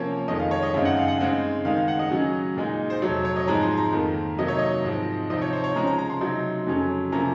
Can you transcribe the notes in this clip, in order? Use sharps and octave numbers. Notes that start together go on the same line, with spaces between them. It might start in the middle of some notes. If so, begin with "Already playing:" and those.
Already playing: C3 F3 A#3 C#4 C#5
F2 D#3 G#3 D#5
F5
C#5
D#5
F#2 C#3 G#3 C4 D#4 F5
F#5
F5
F#5
C#3 G#3 C4 D#4 F5
D#3 G#3 D#4 F5
F5
F#5
D#5
C#3 F#3 C#4
A#2 G#3 D#4
C5
F2 C3 F#3 C#5
C#5
D#5
G#2 F3 G#3 C4 D#4 A#5
C6
A#5
F2 D#3 A#3
C3 F#3 A#3 D#4 D#5
C#5
D#5
G#2 F3 C4
C3 F3 C4 D#4 D#5
C#5
C5
C#5
C#3 F3 G#3 A#5
A#5
A#5
C6
C3 F#3 C4 D#4
F2 C#3 F#3 C#4
C3 F3 A#3 C#4 A#5